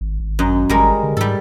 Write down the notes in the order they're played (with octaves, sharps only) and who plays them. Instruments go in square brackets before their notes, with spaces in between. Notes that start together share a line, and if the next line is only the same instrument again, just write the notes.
[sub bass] G#1
G#1
[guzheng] F#2 D#5
[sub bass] G#1 [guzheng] G3 G#3 A#4
[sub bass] D3
[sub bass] G#2 [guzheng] G3 A4